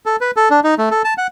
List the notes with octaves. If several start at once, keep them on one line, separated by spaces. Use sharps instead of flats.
A4
B4
A4
D4
D#4
A3
A4
A5
F#5